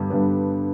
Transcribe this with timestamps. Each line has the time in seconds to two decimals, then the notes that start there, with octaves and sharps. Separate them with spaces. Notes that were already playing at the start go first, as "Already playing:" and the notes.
Already playing: G2 D3 G3 B3
0.10 G2 D3 G3 B3